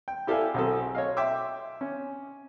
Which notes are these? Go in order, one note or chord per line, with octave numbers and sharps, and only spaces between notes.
G5
E4 G4 A4 D5 F5 G#5
B1 C4 G#4 A4
C#5 D#5 F5
E5 G5 C6 D6 E6
C#4